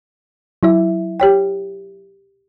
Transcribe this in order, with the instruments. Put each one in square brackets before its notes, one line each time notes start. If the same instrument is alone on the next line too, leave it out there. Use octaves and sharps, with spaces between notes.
[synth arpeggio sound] F#3 E4 E5
[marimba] G4 C#5 G5